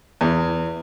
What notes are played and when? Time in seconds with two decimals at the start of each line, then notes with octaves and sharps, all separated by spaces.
0.21 E2